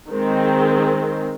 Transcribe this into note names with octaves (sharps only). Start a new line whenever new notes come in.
D#3 G#3 C4